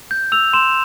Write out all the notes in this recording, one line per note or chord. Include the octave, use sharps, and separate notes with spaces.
G6
E6 F7
C6 E7